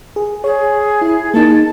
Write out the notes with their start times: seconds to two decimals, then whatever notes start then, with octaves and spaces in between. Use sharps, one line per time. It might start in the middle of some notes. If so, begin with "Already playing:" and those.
0.16 G#4
0.44 G#4 C#5
1.01 E4
1.34 A#3 D#4 A5